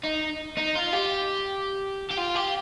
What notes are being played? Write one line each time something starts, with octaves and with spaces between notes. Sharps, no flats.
D#4
D#4
F4
G4
G4
F4
G4